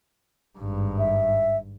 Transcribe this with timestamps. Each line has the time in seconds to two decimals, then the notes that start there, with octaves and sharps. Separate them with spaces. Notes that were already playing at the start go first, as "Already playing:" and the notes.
0.59 G#1 G2
0.99 E5